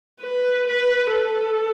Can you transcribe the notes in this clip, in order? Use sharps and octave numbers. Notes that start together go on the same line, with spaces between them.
B4
B4
A4